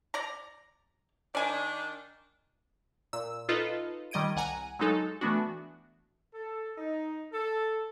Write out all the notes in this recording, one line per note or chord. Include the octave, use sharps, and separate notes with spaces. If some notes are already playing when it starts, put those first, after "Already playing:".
D5 A#5
D#3 D4 D5 G#5
A#2 E6
D#4 F4 A4 B4 D#5
D#3 G3 D#5 G#6 D7 D#7
C2 F#5 G#5 A#5 D#7
F#3 G#3 D#4 A4
E3 A3 B3 D4 F#4
A4
D#4
A4